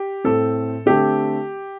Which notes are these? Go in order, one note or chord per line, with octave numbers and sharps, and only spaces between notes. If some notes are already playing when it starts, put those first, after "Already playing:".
Already playing: G4
A2 A3 C4 A4
D3 A3 C4 G4